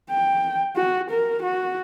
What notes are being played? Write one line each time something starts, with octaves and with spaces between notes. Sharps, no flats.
G5
F#4
A#4
F#4